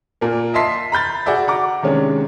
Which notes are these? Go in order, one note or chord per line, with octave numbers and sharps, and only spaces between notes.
A#2 A#3
D#5 E5 A5 C6 B6 C7
A#5 B5 G6 A6
F#4 G#4 D5 E5
F#5 A#5 D6
C3 D#3 G#3 C#4 D4